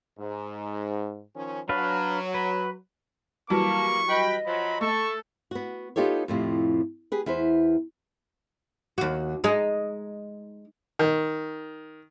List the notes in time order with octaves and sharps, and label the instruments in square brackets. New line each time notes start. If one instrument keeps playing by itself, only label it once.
[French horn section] G#2
D#3 F3 C#4
[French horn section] F#3 [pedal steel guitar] D4 B4 F5
[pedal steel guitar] B4
[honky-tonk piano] E3 F#3 G3 [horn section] A#3 [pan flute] A5 [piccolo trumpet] C#6
[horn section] B4 G5 B5 [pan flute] D#5
[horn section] F3 F#3 [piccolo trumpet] B5
[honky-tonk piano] A3 [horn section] A4 [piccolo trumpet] C#6
[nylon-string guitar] B3 F#4
B3 D#4 F4 G4 A4 C#5
F2 A2 C3 F3
G4 G#4 B4
E2 E4 B4 C5
[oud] D#2 F#4
G#3 D#4
[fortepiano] D#3